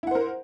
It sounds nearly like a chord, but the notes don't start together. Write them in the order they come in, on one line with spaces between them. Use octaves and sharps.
E4 F#5 C5 A#4